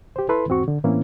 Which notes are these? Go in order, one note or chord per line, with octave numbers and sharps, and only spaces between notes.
G4 C5
E4 A4 B4 B5 C6
E2 G#2 C4 F#4 C#6
D3
A2 E3 A#3 C4 C#4 E4